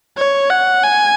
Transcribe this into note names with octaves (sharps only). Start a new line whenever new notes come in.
C#5
F#5
G#5